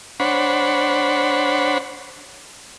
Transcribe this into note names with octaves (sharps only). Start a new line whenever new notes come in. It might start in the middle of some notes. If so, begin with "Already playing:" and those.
D4 C5 C#5 F#5 B5